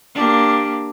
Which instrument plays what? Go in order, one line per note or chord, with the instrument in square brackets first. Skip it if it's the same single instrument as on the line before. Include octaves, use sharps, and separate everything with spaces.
[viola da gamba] A#3 D4 G4